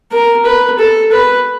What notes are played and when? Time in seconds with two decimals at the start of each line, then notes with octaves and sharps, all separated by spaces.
0.12 A#4
0.46 B4
0.79 A4
1.12 B4